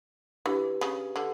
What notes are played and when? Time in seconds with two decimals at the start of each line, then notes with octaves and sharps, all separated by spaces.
0.45 E3 D4 G4 B4
0.81 C#3
1.16 D3